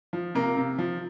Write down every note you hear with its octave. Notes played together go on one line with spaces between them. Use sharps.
F3
C3 A#3 A#4
C3
F3